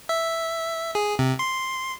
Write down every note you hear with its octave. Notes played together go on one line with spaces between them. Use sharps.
E5
G#4
C3
C6